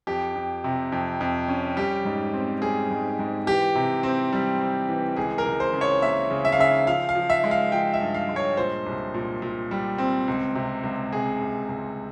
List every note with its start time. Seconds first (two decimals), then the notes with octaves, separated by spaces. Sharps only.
0.07 F2 G4
0.35 F2
0.64 C3
0.92 F2
1.21 F2
1.48 C#4
1.77 G3 G4
2.05 G#2
2.33 C4
2.62 G3 G#4
2.90 G#2
3.19 G#2
3.47 E3 G4
3.75 C3
4.03 C4
4.33 G3
4.60 C4
4.89 E3
5.17 C#2 G#4
5.38 A#4
5.46 C#2
5.60 C5
5.73 C#3
5.81 C#5
6.02 A#3 E5
6.30 C#3
6.45 E5
6.52 F5
6.59 C#3 E5
6.87 F3 F5
7.09 F5
7.15 F3
7.30 E5
7.44 G#3
7.51 F5
7.72 F3 G5
7.94 E5
8.01 G2
8.14 F5
8.29 G#3
8.36 C#5
8.57 A#2 C5
8.86 C2
9.14 A#2
9.42 A#2
9.71 G3
9.98 C4
10.28 C#2
10.55 C3
10.83 C#2
11.12 C3 G#4
11.41 C#2
11.69 C#2